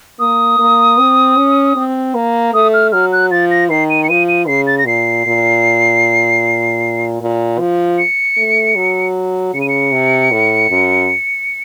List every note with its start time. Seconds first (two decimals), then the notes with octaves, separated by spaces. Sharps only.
0.20 A#3 D#6
0.59 A#3
0.98 C4
1.37 C#4
1.76 C4
2.15 A#3
2.54 A3 D#6
2.74 F6
2.92 F#3 F6
3.13 F#6
3.31 F3 A6
3.51 A#6
3.70 D#3 C7
3.90 D#7
4.04 C#7
4.09 F3 D#7
4.29 D#7
4.47 C#3 C7
4.67 A6
4.78 A#6
4.87 A#2 C7
5.26 A#2
7.21 A#2
7.59 F3
7.98 C#7
8.37 A3
8.76 F#3
9.54 C#3 C#7
9.61 D#7
9.69 C#7
9.92 C3
10.32 A2
10.70 F#2